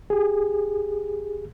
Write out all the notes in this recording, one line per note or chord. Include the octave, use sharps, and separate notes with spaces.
G4 G#4